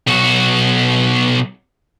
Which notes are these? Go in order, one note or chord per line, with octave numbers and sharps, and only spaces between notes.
B1 F#4